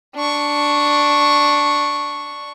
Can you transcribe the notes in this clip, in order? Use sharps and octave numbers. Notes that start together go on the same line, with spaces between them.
D4 C#6